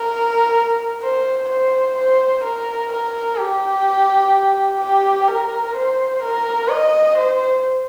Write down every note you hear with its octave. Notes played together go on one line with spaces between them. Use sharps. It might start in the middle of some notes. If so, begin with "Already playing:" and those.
Already playing: A#4
C5
C5
C5
A#4
A#4
G4
G4
A#4
C5
A#4
D#5
C5